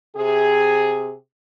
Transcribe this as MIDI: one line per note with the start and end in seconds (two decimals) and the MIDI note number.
0.16 1.12 48
0.16 1.12 68